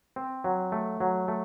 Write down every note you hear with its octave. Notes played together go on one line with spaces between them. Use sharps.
C4
F#3
A3
F#3
A3